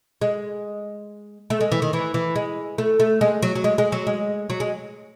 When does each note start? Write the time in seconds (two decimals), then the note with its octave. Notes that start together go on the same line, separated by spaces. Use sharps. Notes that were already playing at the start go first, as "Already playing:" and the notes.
0.21 G#3
1.50 A3
1.61 G#3
1.72 E3
1.82 D#3
1.93 E3
2.14 E3
2.36 G#3
2.78 A3
3.00 A3
3.21 G#3
3.42 F#3
3.55 F#3
3.64 G#3
3.78 G#3
3.92 F#3
4.07 G#3
4.50 F#3
4.60 G#3